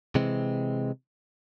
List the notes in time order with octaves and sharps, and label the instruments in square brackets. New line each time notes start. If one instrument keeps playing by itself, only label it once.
[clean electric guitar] C3 E3 G#3 C4